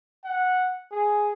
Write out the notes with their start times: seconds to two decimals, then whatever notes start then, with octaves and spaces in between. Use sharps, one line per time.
0.24 F#5
0.91 G#4